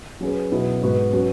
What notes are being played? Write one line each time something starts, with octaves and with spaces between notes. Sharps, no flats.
F#3 C#4 G#4 B4
B2 F#3 B3 E4
G#2 G#3 B3 F#4 B4
F#3 C#4 F#4 B4